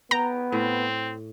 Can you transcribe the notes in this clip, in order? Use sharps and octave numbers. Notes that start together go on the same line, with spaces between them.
B3 G5 A#5
A2 C4